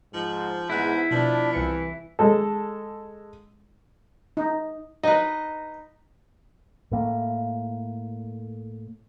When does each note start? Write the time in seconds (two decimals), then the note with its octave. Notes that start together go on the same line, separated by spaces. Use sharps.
0.14 G#2 F3
0.70 E2 G#2 E4 F#6
1.11 B2 F3 D4
1.53 C2 E3 C#7
2.19 G#3 A4
4.37 D#4
5.03 D#4 B4 D#5
6.91 A2 A#3